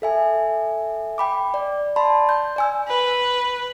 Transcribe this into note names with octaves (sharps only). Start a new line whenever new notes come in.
A4 E5 G#5
G5 B5 D6
D5
D5 A5 B5 C6
G6
D5 G#5 E6
B4